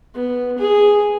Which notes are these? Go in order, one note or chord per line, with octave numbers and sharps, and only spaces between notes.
B3
G#4